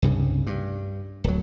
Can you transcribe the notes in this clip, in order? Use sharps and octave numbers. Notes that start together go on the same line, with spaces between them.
C2 G2 C#3
G2
D1 F#3